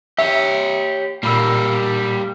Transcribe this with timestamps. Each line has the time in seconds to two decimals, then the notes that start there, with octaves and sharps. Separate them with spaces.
0.19 G4 C#5 E5
1.23 A#2 G3 A#3 B5 E6